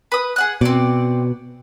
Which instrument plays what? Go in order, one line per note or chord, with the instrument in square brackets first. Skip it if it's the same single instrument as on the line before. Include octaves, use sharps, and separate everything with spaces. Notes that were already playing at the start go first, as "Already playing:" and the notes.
[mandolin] B4 D#6
G#4 F#5 F#6
[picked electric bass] B2 [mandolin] C4 D5